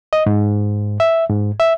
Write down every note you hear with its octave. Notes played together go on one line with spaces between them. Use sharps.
D#5
G#2
E5
G#2
E5